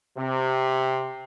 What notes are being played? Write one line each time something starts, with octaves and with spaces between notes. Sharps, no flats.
C3